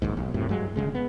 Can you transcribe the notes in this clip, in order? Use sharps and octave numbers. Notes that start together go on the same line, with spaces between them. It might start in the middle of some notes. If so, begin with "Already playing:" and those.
A#1 D#2 G#2
B1
F#2 A2 C3
G2 F#3 G#3
G1 C#3 G#3
B3